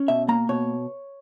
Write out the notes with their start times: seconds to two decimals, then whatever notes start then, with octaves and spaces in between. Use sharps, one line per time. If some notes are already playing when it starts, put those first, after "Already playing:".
Already playing: C#4
0.08 B2 E5
0.28 A#3 A#5
0.49 B2 C#5